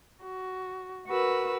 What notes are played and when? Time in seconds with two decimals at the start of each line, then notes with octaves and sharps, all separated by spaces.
0.21 F#4
1.08 F#4 A#4 B4 E6